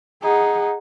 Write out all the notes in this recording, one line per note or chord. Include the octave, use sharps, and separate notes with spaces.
D#4 G#4 F#5